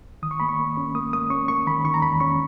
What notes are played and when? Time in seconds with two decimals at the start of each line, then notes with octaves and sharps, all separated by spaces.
0.22 D#3 D#6
0.31 C#6
0.40 A#3 B5
0.49 C#6
0.59 A#3
0.77 C#4
0.95 A#3 D#6
1.13 A#3 D#6
1.30 C#4 C#6
1.48 A#3 C#6
1.67 D#3 B5
1.84 D#3 C#6
1.94 A#5
2.02 E2 B5
2.20 C#4 C#6